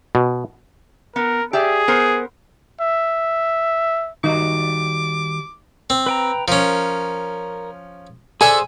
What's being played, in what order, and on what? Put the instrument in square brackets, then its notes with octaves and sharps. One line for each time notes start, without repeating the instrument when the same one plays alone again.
[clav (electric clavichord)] B2
[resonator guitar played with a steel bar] B3 [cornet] A#4
[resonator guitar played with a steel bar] G4 D5 E5 [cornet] G#4
[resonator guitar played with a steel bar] B3 A#4 C5
[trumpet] E5
[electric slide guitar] D#3 G3 F#4 [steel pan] D#4 [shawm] D6
[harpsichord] C4
[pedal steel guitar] B4 G5 A#5
[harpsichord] F3 C#4 [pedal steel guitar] A#4
[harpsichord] D4 A4 E5 [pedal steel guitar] G#4 C5 [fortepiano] G#5